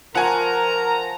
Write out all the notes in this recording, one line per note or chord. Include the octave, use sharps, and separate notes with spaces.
F3 A#4 C5 F#5 G#5 A#5 C#6